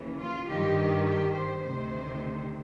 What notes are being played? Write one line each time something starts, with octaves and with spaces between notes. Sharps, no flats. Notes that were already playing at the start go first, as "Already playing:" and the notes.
Already playing: D#2 C#3 E3
F4
G2 D#3 G4
G4
C5
D2 C3 D#3 C5